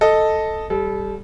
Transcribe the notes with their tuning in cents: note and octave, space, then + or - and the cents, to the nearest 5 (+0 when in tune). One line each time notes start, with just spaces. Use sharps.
A4 +0 D#5 +0
G3 +0 A4 -30